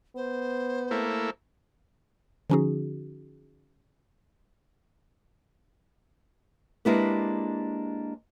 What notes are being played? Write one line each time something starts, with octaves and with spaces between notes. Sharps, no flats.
B3 C5
A3 A#3 E4
D3 F3 C#4 D#4 F#4 G#4
G#3 A#3 D4 E4 G4 B4